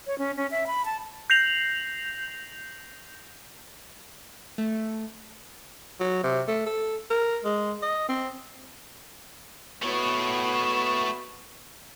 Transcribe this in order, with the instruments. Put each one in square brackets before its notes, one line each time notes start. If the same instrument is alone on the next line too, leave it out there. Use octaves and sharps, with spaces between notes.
[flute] C#5
C#4
C#4
E5
B5
A5
[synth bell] G6 A#6 C7 F7 F#7
[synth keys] A3
[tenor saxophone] F#3
C3
A3
A4
A#4
G#3
D#5
C4
[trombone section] B2 B3 [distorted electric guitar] A3 C#5